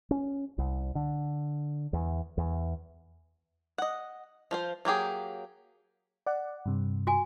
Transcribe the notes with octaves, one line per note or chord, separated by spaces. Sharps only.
C#4
C2
D3
E2
E2
D#5 F#5
F3 F4 C5
F#3 A#3 G4 G#4
D5 F#5
G2 C3
F#4 G#5